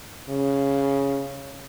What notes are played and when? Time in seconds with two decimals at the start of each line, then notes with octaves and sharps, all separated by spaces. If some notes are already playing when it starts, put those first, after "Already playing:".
0.29 C#3